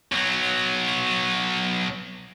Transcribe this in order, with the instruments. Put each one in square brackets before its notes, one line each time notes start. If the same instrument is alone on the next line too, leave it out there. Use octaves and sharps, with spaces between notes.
[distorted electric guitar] B1 F#3